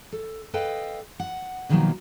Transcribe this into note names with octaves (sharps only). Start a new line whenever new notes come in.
A4
A4 B4 D#5 F5 G5
F#5
B2 D3 D#3 F3 F#3 A#3